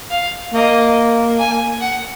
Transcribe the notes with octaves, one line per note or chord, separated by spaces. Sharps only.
F5
A#3 D#5
G#5
F#5